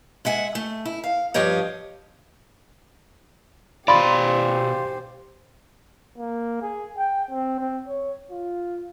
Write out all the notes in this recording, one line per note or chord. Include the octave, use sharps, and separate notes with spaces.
G#3 E5 F#5 G#5
A3
E4
F5
G2 F3 G4 C#5 D#5
B2 G4 C5 D5 F5 B5 C6 A6
A#3
G#4
G5
C4
C4
C#5
F4